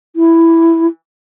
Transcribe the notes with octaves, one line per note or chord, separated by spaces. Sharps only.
E4